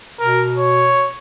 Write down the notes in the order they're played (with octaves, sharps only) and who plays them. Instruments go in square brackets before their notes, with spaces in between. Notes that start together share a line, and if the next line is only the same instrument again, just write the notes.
[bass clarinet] B2 [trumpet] A#4
[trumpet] C#5